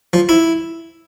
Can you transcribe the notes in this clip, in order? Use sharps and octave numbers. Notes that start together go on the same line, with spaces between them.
F3
E4